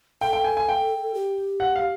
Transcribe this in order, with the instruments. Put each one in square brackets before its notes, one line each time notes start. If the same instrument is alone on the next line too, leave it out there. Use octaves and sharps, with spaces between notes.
[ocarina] A4 [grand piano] G5
[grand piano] G5
G#5
G#5
G5
[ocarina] G4
[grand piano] F#5
F5